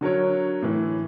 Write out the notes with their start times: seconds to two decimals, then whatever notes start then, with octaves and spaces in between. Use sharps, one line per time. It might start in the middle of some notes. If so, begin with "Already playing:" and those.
0.01 D3 F#3 A#4 C#5
0.62 A2 E3